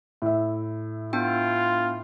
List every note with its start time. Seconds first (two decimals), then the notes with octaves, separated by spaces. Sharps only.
0.22 A2 E5
1.13 B3 D4 F4 G5